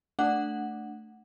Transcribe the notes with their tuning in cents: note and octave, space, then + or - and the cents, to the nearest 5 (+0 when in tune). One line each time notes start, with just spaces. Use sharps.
A3 +0 D4 +0 F#5 +0